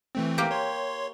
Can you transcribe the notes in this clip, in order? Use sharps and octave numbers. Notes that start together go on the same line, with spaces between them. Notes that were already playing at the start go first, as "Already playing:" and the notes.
E3 A3 C4
A#3 G4
C#5 C6